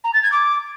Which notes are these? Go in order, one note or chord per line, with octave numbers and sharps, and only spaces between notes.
A#5
A6
G#6
D6